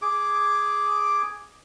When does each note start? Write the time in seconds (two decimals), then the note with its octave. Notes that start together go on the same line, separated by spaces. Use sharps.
0.02 G#4 D6